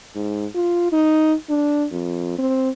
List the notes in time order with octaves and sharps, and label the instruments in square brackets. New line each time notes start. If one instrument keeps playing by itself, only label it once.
[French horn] G#2
F4
D#4
D4
F2
C4